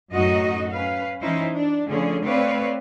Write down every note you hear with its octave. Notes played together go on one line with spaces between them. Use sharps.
F#2 A2 F#3 D#4 F#4 D#5
C#4 B4 F5
E3 C#4 D#4 E4 C5
D4
D3 F3 A3 C#4 G#4
A3 C4 B4 C#5 D5 F5